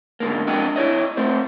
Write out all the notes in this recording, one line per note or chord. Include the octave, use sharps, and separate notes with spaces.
G#2 D3 A#3
F2 D4 F#4 D#5 G5
E4 C#5 D#5
A3 C4 C5